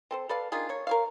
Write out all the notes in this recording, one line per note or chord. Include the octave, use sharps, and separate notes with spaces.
C4 A4 C5
A4 B4 D5 F5
D#3 D4 F4 G#4
A#3 C#5
A#4 C#5 F5